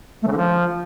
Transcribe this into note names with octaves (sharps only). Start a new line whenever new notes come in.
A3
C#3
D3
F3